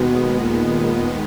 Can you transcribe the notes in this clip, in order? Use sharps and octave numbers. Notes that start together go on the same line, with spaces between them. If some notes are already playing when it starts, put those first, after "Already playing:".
Already playing: D#2 B2 D#3 G#3 B3
A#2